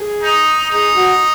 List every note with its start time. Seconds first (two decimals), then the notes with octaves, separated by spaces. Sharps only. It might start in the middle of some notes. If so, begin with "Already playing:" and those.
Already playing: G#4
0.21 D#4
0.70 D#4 G#4
0.95 F#4